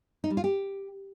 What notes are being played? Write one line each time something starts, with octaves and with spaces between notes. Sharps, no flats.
D#4
G3
F4
G4